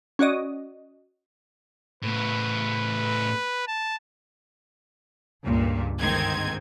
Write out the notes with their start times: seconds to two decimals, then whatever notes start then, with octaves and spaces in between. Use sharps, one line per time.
0.19 C#4 F#4 D5 D#5
2.03 A2 B3 B4
3.67 A5
5.42 C#2 G2 A#2
5.99 G1 G#2 D#3 C4 D#4 G#6